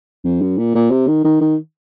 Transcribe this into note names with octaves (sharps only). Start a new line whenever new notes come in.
F2
F#2
A#2
A#2
C3
D#3
D#3
D#3